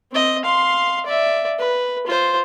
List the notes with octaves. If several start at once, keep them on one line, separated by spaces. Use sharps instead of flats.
C4 D#5
F5 C6
D5 E5
B4
F4 C5